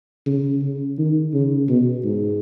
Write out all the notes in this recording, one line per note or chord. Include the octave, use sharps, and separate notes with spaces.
C#3
C#3
D#3
C#3
B2
G#2